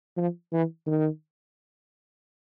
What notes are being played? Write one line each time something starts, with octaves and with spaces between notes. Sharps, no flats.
F3
E3
D#3